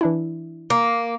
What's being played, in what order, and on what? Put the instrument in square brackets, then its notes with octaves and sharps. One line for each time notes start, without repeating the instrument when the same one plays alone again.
[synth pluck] E3 D4 E4
[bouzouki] A#3